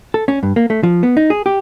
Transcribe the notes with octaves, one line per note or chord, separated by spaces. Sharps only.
A4
C#4
G2
A#3
A3
F3
B3
D#4
G#4
G4